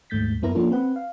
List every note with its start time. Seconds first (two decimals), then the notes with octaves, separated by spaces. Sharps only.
0.10 D#2 G#2 A3 G6 A6 B6
0.42 F#2 B3 E4 A#4 A#5
0.55 F3 A#3 C#4 D4 F4 A4
0.71 C4 B4 F#5
0.96 F5